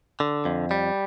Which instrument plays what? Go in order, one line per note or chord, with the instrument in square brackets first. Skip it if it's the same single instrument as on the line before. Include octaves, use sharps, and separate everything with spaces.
[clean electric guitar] D3
F2
G3